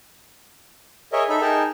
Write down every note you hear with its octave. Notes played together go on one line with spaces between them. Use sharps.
G#4 A#4 C#5 D#5 E5
D#4 A4 E5 B5
D#4 G#4 A#4 G5 A5